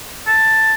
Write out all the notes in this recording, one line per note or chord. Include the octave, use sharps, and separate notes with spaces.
A5